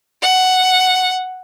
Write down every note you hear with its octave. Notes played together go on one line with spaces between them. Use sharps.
F#5